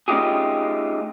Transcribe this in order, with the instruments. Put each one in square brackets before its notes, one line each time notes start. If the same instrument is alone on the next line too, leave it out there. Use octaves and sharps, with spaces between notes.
[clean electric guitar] A3 C#4 D#4 F4 G4 G#4